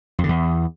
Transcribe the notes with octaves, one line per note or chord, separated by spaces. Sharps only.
F2
D3
E2